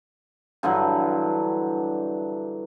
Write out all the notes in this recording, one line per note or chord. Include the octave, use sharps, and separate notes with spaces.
G2 D3 E3 F#3